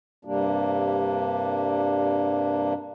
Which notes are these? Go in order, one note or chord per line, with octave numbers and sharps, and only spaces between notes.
G2 C3 G3 A#3 D4